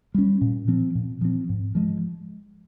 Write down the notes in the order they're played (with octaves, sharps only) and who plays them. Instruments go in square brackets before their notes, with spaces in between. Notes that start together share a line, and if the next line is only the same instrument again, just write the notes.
[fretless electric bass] G3 C#4
A#2
F3 C4
A#2
F3 C4
G#2
F3 G#3